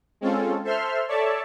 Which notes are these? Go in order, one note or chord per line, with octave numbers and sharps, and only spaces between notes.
G#3 C4 C#4 F4 A4
A4 C5 E5 C6 F6
A4 C#5 D5 E5 A5